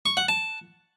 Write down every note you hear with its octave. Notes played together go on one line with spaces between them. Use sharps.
C#6
F#5
A5